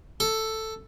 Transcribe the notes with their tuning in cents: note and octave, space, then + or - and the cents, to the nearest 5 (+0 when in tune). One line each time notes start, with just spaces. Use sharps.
A4 +5